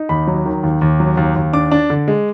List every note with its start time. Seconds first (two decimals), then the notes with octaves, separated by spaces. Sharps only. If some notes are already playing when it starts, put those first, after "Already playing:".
Already playing: D#4
0.09 D#2 B5
0.27 F#3
0.46 D#3
0.63 D#2
0.81 D#2
1.00 F#3
1.17 D#2
1.36 D#2
1.53 D4 D6
1.71 D4
1.90 D3
2.08 G#3